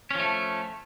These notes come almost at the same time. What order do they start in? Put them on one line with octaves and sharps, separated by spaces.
C#4 F3 A3